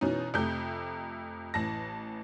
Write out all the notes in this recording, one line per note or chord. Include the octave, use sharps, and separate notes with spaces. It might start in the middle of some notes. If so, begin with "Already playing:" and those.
B2 E3 C#4 D#4
F2 C3 A3 G6
A1 E3 A5 A#6